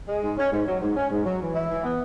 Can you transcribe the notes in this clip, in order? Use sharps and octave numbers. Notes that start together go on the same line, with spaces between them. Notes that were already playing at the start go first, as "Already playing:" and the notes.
G#3
G#2
C#4
G#2
F#3
G#2
C#4
G#2
F#3
E3
E4
E3
B3